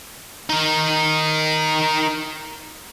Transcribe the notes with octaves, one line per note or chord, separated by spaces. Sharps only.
D#4 A#4